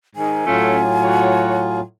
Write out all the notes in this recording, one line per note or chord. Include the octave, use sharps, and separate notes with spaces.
G#2 D#3 G#5
A2 F#3 A3 C#4 F4
F#4 C#5